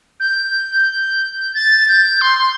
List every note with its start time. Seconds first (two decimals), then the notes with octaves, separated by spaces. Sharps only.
0.20 G6
1.54 A6
1.88 G6
2.21 C6
2.39 C6